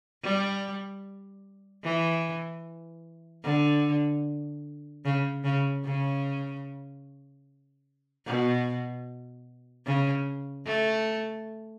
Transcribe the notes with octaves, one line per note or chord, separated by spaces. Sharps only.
G3
E3
D3
C#3
C#3
C#3
B2
C#3
A3